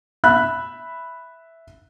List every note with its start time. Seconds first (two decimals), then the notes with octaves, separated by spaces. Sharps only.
0.24 E5 B5 F#6